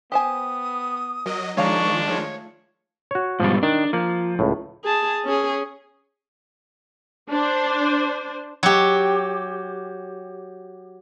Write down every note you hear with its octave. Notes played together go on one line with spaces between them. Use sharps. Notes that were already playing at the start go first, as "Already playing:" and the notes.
B3 G4 C5 G#5 D#6
F#3 A#4 D#5
D#3 F3 G#3 D4 C#5 F5 A#5 C#6
A3 F4 C#5
F#4 C#5
G#2 B2 F3 G3
D#3 D4
F3 A#3
C#2 A2
G#4 A5
C#4 G#4
D4 C5
F#3 G4